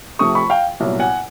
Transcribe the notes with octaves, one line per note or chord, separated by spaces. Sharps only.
C3 F3 A3 C4 C#6 D#6
B5 C#6
F5 G5
C2 A#2 F#3 B3
F#5 G#5